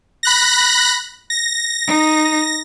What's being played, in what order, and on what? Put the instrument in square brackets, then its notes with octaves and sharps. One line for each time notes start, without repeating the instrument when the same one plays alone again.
[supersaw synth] B5 F#6 A#6
A#6
[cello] D#4